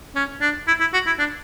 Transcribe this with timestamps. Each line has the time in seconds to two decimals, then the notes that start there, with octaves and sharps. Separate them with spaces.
0.15 C#4
0.41 D4
0.67 E4
0.80 E4
0.94 F#4
1.06 E4
1.19 D4